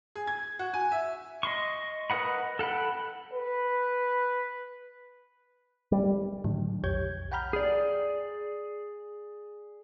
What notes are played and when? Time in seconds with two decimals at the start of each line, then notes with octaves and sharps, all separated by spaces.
0.16 G#4
0.27 G#6
0.59 F#4
0.74 G#5
0.92 E5
1.43 D#5 C6 C#6
2.10 A#4 B4 D#5 F#5 B5
2.59 A4 F#5 G5 B5
3.33 B4
5.92 G3
6.44 A2 D3 D#3 F#3
6.84 B1 F2 G4 C#5 G6 G#6
7.32 F#5 G5 A#5 B5 F6 G6
7.53 G#4 D5